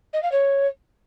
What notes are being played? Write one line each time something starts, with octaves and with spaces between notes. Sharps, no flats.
D#5
F5
C#5